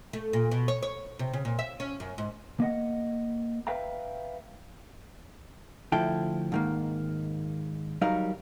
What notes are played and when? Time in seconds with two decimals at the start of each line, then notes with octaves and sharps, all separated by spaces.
0.13 A3
0.33 A#2
0.51 B2
0.68 C#5
0.83 C#5
1.19 C3
1.33 C#3
1.45 A#2
1.59 E5
1.80 C#4
2.00 F#2
2.18 G#2
2.60 A#3 D#5 F#5
3.67 B4 E5 F5 G5 A#5
5.92 D2 F3 E4 A4 G5
6.52 G#2 D#3 A#3
8.01 F#3 G3 D#4 A#4 F5